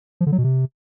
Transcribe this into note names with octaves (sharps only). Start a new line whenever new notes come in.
F3
D3
F#3
B2
C3